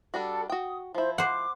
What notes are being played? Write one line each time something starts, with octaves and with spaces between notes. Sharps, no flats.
G3 D4 F#4 A4
F#4 G5 D#6
F3 E4 C5
C5 F#5 D6